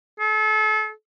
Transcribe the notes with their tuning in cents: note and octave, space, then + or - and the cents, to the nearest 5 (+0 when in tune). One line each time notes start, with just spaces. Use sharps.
A4 -35